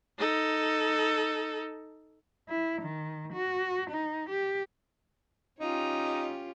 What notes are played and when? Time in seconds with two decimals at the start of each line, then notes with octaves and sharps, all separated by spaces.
0.19 D#4 A4
2.49 E4
2.82 D#3
3.33 F#4
3.90 D#4
4.30 G4
5.60 C#4 D#4 F4 G4